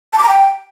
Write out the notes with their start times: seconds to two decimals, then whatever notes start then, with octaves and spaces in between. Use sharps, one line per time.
0.13 A5
0.18 D6
0.23 A#5
0.29 G5